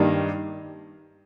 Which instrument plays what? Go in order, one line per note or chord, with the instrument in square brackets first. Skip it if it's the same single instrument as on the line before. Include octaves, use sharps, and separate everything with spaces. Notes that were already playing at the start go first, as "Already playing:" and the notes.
Already playing: [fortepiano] G2 D#3 G3 A#3 D#4